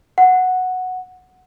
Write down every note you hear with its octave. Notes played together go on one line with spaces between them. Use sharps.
F#5